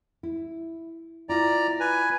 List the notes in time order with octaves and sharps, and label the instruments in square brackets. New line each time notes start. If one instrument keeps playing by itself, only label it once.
[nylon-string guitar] E4
[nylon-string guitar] E4 F4 [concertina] D5 A#5
[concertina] B4 G#5